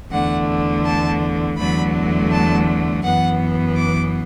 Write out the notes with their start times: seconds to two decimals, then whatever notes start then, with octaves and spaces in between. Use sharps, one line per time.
0.11 E2 D3 A3 F#5
0.85 A5
1.57 E2 D3 F#3 A3 B5
2.31 A5
3.03 F#2 E3 B3 F#5
3.76 D6